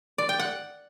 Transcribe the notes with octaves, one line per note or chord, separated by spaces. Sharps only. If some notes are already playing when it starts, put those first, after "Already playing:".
D5
G5
F#5